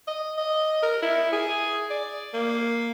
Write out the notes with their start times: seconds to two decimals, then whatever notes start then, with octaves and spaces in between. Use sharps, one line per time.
0.08 D#5
0.38 D#5
0.83 A#4
1.02 E4
1.32 G#4
1.90 D5
2.34 A#3